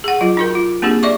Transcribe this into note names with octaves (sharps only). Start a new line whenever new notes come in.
G#4 F#5
F#3 F4
D#4 F#4 A#4
F4
A#3 C4 D4 G4 G#4
D5 E5 C#6 D6